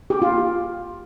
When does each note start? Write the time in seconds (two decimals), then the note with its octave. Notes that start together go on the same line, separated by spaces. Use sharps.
0.10 G4
0.22 F4